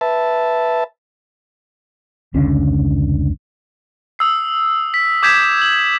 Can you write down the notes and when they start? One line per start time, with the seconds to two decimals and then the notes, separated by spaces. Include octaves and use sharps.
0.01 B4 E5 A5
2.34 F1 C#2 D3 C#4
4.19 D#6 E6 C7
4.94 B6
5.23 D6 D#6 G6 G#6 B6 E7
5.40 G6
5.58 G6 F#7